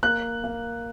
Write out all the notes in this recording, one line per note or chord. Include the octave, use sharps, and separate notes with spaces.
A#3 F#6
A#3